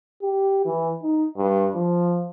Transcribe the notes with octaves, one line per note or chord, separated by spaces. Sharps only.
G4
E3
D#4
G2
F3